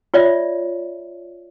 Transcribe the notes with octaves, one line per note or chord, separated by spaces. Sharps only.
F4 C#5 D5 E5